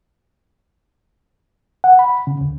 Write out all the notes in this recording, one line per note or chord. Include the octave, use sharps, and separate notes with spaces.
F#5
B5
C#3
D2